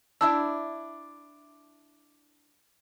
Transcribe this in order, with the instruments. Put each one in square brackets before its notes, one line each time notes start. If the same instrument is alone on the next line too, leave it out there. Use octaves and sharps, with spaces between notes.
[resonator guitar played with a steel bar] D4 E4 E5 [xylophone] A5 E6